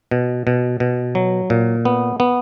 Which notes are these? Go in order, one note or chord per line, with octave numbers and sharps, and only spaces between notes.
B2
B2
B2
F#3
A#2
B3
B3